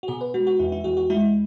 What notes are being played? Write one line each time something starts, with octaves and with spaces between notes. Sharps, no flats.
F#4
B2 G#4
B4
G#3 F#4
F#4
E2 E4
E4
E2 F#4
F#4
G#3 E4